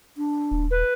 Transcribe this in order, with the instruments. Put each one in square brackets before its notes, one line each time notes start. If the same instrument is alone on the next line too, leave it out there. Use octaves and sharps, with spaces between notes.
[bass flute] D4
[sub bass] D#1
[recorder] B4